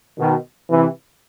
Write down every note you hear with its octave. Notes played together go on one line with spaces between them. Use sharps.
B2 D#3
C3 E3